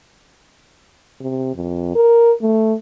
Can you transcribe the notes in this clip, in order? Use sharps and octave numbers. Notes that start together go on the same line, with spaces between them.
C3
F2
A#4
A3